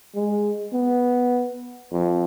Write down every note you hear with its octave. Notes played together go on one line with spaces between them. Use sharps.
G#3
B3
F2